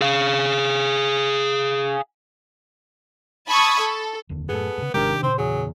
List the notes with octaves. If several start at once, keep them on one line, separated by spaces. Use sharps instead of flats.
G#4 F5
A5 B5 C#6 D#6 E6 G#6
A4
F1 D#2 D3
F#2 A2 B3 G#4 A4
G2 C#3
G#1 D#2 C3 D#3 G#3 D4 G4 A#4
A#2 C#3 C4 C5
E2 F#3 G#4